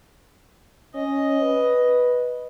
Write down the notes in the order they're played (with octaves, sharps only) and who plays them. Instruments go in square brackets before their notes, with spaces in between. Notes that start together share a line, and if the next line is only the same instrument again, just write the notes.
[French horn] C#4 [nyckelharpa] D#5
[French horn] B4